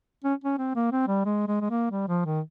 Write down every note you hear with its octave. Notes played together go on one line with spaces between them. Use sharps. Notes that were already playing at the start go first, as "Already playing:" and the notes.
C#4
C#4
C4
A#3
C4
G3
G#3
G#3
G#3
A#3
G3
F3
D#3